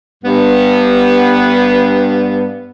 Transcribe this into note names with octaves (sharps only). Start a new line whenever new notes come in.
G2 B3